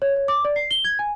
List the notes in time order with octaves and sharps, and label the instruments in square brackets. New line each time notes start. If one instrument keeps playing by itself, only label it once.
[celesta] C#5
C#5
D6
D5
C7
G7
G#6
G#5